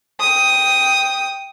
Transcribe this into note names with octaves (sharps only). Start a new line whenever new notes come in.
G5 D#6